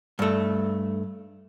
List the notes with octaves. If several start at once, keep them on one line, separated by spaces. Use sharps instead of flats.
G2 A3